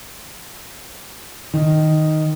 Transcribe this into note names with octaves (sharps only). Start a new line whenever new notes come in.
D#3